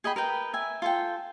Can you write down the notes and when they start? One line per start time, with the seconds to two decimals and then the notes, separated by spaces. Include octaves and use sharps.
0.04 G#4 D#5 G5 B5
0.16 A#4 B4 G5
0.53 E5 G#5
0.82 F4 A4 G5